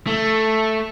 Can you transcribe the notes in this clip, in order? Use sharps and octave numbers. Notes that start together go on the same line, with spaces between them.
A3